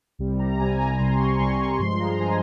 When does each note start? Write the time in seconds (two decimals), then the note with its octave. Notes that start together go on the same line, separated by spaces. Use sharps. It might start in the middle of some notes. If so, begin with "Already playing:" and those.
0.19 C2 C3 G3
0.39 A#5
0.59 C2 C3 G3 G#5
0.79 A#5
0.99 C2 C3 G3 C6
1.20 C#6
1.40 C2 C3 G3 C6
1.59 C#6
1.79 G2 F3 G#3 C6
2.00 A#5
2.20 F3 G#3 G#5